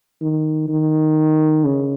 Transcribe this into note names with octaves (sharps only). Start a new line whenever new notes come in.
D#3
D#3
C#3